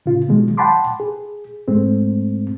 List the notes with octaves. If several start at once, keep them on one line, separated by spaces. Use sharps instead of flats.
A2 C#3 F4
B2 D#3 F#3 G#3
F#5 G5 A5 B5 C6 D6
G#4
G#2 G#3 A3 C4